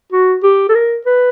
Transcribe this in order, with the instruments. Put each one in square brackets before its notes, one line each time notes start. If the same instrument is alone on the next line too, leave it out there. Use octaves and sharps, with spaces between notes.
[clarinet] F#4
G4
A4
A#4
B4